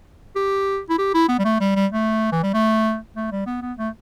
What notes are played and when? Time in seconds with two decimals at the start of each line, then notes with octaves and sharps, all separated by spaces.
0.36 G4
0.90 E4
0.99 G4
1.14 E4
1.29 B3
1.39 G3
1.45 A3
1.60 G3
1.76 G3
1.92 A3
2.32 E3
2.43 G3
2.54 A3
3.16 A3
3.32 G3
3.47 B3
3.62 B3
3.78 A3